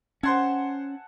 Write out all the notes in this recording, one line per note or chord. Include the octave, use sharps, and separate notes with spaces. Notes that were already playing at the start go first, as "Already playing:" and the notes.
C#4 C5 F#5 G#5 A5 C6 G#6